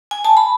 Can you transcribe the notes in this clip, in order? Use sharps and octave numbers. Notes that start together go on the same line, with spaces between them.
G#5
A5
B5